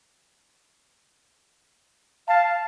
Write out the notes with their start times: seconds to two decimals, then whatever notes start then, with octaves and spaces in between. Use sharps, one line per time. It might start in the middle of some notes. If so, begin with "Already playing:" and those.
2.28 F5 A5